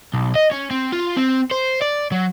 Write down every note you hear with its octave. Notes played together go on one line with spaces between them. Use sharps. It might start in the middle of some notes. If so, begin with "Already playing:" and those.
B1
D#5
C#4
C4
F4
C4
C5
D5
F#3